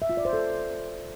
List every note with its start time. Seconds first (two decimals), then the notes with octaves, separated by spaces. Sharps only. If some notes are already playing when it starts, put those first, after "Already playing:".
0.02 E5
0.09 F4
0.17 D5
0.25 C5
0.33 A4